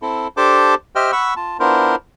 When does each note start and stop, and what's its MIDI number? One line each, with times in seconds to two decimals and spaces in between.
0.02 0.28 60
0.02 0.28 64
0.02 0.28 69
0.37 0.75 62
0.37 0.75 67
0.37 0.75 69
0.37 0.75 72
0.37 0.75 81
0.37 0.75 86
0.96 1.11 67
0.96 1.11 72
0.96 1.11 75
0.96 1.11 76
0.96 1.11 79
0.96 1.11 89
1.12 1.34 78
1.12 1.34 83
1.12 1.34 85
1.12 1.34 88
1.36 1.57 65
1.36 1.57 81
1.60 1.96 59
1.60 1.96 62
1.60 1.96 64
1.60 1.96 65
1.60 1.96 70
1.60 1.96 72